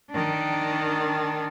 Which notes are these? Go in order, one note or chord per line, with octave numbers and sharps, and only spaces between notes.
D#3 D4